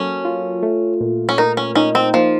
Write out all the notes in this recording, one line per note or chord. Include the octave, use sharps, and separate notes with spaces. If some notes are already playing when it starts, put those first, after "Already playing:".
Already playing: F#3 A#3 C#4 A4
F4
A3
A#2
C#4
D#4 A#4
C#4
C#4 D#4
C4
F3 A#3